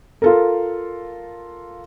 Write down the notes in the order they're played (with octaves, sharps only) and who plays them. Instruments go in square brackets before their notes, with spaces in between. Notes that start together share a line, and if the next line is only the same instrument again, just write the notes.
[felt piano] F4 A4 A#4